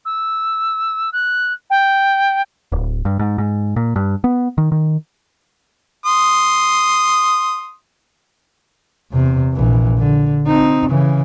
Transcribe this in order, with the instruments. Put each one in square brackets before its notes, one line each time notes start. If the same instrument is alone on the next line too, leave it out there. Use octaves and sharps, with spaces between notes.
[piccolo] E6
F#6
G5
[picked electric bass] D1
G2
G#2
G#2
A#2
G2
B3
D#3
D#3
[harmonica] C6 D#6
[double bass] E2 C3
A#1 E3
D3
C4 D#4
C#3 E3